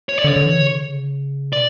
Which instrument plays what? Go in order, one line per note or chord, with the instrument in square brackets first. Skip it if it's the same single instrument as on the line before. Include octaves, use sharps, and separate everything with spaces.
[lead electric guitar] C#5
D5
[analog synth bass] D3
[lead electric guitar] C#5
[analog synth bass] D3
E3
C#3
D3
C#3
[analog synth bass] B2 [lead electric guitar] D5